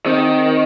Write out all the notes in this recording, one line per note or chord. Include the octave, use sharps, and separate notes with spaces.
D#3 C4 D#4 G#4 C5